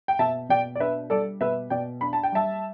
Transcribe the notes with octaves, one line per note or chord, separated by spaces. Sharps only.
G5
B2 E5 A5
B2 D5 G5
D5
D4 B4 E5
G3 A4 D5
B2 B4 E5
B2 D5 G5
D4 B5
A5
G5
G3 E5 A5